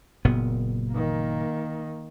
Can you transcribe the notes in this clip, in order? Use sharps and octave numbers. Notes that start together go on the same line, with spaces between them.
F#1 A#2 B3
D#3 A#3